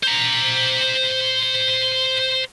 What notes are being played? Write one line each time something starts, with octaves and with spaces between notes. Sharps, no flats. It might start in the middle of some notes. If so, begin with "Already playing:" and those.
C5 A#5